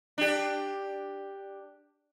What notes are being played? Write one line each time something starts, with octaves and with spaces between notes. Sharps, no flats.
D4 G4